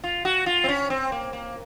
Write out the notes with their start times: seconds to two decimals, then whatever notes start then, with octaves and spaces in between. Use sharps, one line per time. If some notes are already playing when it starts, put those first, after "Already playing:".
0.04 F4
0.25 F#4
0.46 F4
0.64 C4
0.69 C#4
0.90 C4
1.12 A#3
1.33 A#3